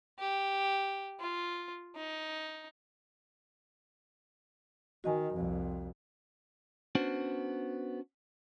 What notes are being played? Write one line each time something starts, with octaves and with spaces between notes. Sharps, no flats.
G4
F4
D#4
D#3 F#4 D#5 G#5
C2 F2
B3 C#4 D4 F#4 C5